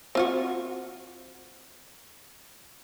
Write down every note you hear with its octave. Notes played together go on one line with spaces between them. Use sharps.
C4 F4 F#4